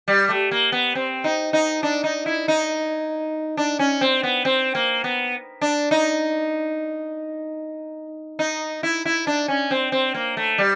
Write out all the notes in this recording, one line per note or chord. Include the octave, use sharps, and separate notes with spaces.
G3
A3
A#3
B3
C4
D#4
D#4
D4
D#4
E4
D#4
D4
C#4
C4
B3
C4
A#3
B3
D4
D#4
D#4
E4
E4
D4
C#4
C4
C4
A#3
A3
G3